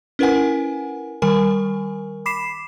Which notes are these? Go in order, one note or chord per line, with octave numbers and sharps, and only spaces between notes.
C#4 E4 A#4 B4 F#5 G#5
D#3 G3 A#4 G#5
B5 D6 B6 C7 E7